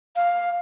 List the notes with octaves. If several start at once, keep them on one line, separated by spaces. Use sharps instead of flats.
F5